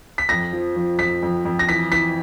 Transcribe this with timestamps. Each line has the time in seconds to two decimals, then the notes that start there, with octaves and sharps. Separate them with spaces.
0.18 B6
0.29 F2 A#6
0.53 F3
0.76 F3
0.99 F2 B6
1.23 F2
1.45 F2
1.59 A#6
1.69 E3 B6
1.92 E3 B6